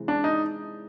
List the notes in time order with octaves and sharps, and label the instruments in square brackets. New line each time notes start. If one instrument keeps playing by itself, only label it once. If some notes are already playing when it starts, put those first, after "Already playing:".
Already playing: [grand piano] C3 E3 G#3
[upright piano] D4
D#4